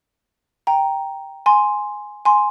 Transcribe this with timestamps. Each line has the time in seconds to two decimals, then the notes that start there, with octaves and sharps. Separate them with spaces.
0.67 G5 A#5
1.46 G#5 C6
2.25 G#5 C6